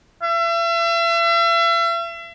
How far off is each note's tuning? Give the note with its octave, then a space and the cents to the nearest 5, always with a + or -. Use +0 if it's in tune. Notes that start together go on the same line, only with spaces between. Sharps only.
E5 +40